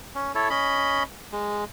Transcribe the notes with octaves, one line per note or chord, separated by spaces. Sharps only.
C#4
E4 A4 C#5
C#4 D#5 B5
G#3